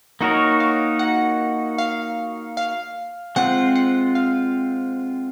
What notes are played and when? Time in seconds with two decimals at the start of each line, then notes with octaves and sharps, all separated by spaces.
0.21 A#3 D#4 F#4 A#4 C#5 D#5
0.60 F5
0.99 F#5
1.78 F5
2.57 F5
3.36 G#3 C4 F4 F#5
3.76 F#5
4.15 F5